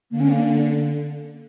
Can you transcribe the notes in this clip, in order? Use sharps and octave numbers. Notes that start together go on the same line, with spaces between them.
D3 A#3
C#4
A#3